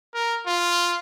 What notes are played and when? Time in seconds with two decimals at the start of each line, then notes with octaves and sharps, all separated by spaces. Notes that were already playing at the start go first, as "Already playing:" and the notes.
0.14 A#4
0.47 F4